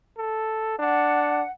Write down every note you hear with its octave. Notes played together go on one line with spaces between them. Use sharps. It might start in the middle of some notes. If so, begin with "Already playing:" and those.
A4
D4 F#5